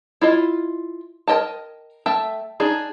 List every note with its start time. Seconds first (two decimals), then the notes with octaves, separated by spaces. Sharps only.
0.21 E4 F4 D#5
1.28 A#4 C5 D#5 G5 A5
2.06 A3 E5 G5 A5
2.60 D4 D#4 G#4